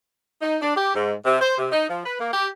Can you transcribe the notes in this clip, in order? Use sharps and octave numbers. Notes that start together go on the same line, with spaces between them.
D#4
D4
G4
G#2
C3
C5
C3
D#4
F3
B4
A#3
G4